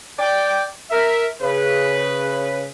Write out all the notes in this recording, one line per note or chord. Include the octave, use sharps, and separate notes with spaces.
D5 G5
A#4 E5
C#3 B4